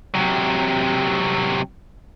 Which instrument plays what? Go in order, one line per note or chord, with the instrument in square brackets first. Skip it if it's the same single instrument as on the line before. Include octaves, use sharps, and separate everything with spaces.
[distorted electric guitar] C3 F#3